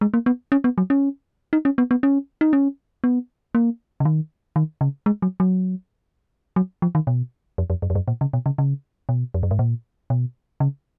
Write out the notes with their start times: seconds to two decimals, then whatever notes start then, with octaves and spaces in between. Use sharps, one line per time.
0.01 G#3
0.14 A#3
0.26 B3
0.52 C#4
0.64 B3
0.78 F#3
0.90 C#4
1.53 D#4
1.65 C#4
1.78 B3
1.91 B3
2.03 C#4
2.41 D#4
2.53 C#4
3.04 B3
3.55 A#3
4.00 C#3
4.05 D#3
4.56 D#3
4.81 C#3
5.06 G#3
5.22 F#3
5.40 F#3
6.56 F#3
6.82 F3
6.95 D#3
7.07 B2
7.58 F2
7.70 F2
7.82 F#2
7.90 F2
7.95 F#2
8.08 A#2
8.21 C#3
8.33 B2
8.46 C#3
8.58 C#3
9.09 B2
9.34 F2
9.43 F#2
9.51 G#2
9.59 A#2
10.10 B2
10.60 C#3